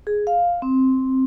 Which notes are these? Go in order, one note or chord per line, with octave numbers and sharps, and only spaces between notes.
G#4
F5
C4